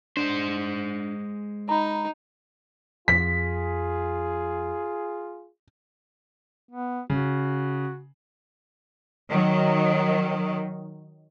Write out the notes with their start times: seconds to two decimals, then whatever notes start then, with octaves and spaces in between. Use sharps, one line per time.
0.17 G#3 D4 C5
1.69 D#4 A#5 B5
3.08 F2 F4 G#4 B6
6.69 B3
7.10 C#3 F#4
9.29 D#3 F#3